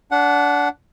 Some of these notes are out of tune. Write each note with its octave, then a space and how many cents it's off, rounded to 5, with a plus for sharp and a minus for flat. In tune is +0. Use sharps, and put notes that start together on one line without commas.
D4 -25 F#5 -5